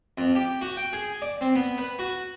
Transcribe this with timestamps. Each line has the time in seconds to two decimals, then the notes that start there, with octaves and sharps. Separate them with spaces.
0.18 F2
0.35 G4
0.62 F#4
0.77 G5
0.93 G#4
1.22 D5
1.41 C4
1.55 B3
1.78 B4
1.99 F#4